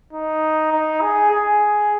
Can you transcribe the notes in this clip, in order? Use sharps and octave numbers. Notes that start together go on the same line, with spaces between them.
D#4
D#4
G#4
G#4